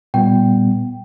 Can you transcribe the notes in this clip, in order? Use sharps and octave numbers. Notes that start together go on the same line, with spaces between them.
A#2 G3 B3 G5